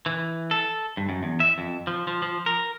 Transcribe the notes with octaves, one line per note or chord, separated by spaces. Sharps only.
E3
A4
G2
F#2
E2
E5
F2
F3
F3
F3
A#4